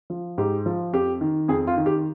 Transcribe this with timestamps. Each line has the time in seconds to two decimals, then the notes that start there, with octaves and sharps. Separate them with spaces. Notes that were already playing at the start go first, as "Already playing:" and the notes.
0.10 F3
0.38 G#2 G4
0.66 F3
0.93 F2 G4
1.21 D#3
1.48 F2 G#4
1.67 F4
1.77 D#3
1.86 G4